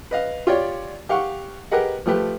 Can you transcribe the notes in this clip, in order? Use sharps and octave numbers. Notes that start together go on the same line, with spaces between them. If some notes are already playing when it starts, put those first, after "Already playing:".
B4 D#5 F5
F4 G4 C#5 D5
G4 F5 F#5 C#6
G4 G#4 A#4 B4 D#5 F#5
F3 A3 G4 B4